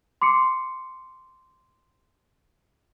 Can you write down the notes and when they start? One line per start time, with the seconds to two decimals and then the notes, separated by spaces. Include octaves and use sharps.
0.21 C6 D6 C7 C#7